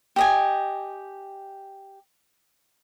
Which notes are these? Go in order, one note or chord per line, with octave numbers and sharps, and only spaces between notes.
G4 D#5 G#5